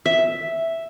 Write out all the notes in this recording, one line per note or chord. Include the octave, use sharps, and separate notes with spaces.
E5